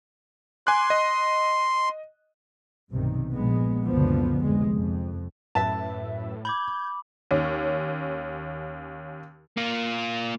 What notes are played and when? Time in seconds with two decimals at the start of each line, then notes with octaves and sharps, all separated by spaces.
0.67 G#5 C6 D6 F#6
0.90 D#5
2.91 B1 G2 C3 D#3
3.30 A#1 G#3 B3
3.84 F#1 C#2 B2 D3 F3 B3
4.43 F1 G#3
4.75 F2
5.55 F#2 A2 B4 E5 A5
6.45 B5 D6 G6 G#6
7.31 D#2 C#4
9.57 A#3 F4